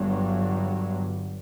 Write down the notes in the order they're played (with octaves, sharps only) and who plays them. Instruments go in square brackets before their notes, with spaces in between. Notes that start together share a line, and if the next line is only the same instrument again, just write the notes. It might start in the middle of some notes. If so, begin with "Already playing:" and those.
Already playing: [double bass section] G1 G2 F#3